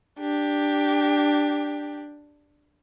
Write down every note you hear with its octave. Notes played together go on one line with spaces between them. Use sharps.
D4 G4